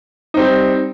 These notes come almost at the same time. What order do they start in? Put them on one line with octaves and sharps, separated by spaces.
D#4 C4 G3